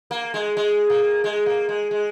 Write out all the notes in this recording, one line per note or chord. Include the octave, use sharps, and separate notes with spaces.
A#3
G#3
G#3
A#3
G#3
A#3
G#3
G#3